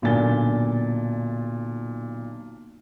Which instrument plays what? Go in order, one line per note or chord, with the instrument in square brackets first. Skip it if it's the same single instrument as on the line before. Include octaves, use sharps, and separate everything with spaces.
[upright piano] B1 A#2 D3 G#5 A6 G7